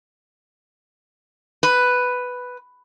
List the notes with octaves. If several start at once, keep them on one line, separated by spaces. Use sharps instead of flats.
B4